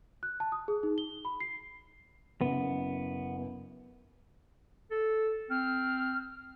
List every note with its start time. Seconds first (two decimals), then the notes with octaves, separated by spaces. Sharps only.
0.23 F#6
0.40 A5
0.52 D#6
0.68 G#4
0.83 D#4
0.98 G7
1.25 B5
1.40 C7
2.41 F#1 F#2 B3
4.91 A4
5.50 C4 F6